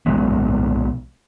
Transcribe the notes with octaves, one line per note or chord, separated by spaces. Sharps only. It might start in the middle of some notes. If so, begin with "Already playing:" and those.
B1 F3 G#3 B3